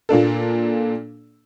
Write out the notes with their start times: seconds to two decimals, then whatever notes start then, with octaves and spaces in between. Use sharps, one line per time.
0.09 A#2 A#3 D4 A4